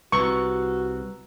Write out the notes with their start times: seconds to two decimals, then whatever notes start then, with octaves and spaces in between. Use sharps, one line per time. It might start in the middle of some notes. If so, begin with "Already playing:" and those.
0.12 C2 F#4 B4 A#5 C#6 E6